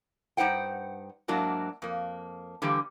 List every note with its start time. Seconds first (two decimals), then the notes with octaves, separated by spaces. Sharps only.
0.37 G2 D#4 C5 F#5 G5
1.28 G#2 F#3 A#3 D4 E4 F#4
1.82 F2 A#3
2.62 D3 E3 G3 A#3 G4